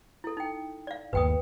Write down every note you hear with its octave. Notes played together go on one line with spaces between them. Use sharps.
E4 A4
D#4 G5
D5 F5
G1 D#2 B4 G5 D#6